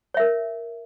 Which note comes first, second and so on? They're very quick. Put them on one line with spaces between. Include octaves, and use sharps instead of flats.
C#5 E5 A#4